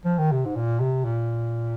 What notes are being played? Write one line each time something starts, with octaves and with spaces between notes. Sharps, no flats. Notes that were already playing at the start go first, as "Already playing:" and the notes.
F3
D#3
C3
G#2
A#2
C3
A#2